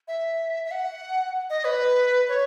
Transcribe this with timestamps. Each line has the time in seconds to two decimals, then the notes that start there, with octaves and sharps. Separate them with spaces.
0.08 E5
0.65 E5
0.71 F#5
1.50 D#5
1.65 B4
2.28 C#5